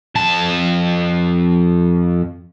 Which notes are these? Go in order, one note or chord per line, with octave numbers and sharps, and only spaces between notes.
F2 A5